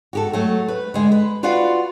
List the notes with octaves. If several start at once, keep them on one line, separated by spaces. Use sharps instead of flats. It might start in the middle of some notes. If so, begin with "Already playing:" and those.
F#4 G4 A4
F#3 A3
B4
D3 G#3
B4
F4 F#4 B4 D5 F5 F#5